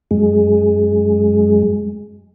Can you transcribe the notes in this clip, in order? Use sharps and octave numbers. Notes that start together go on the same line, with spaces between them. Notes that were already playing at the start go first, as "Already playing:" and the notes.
F#2 G#3